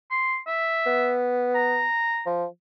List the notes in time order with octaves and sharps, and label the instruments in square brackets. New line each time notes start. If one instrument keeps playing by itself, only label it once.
[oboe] C6
E5
[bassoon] B3
[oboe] A#5
[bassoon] F3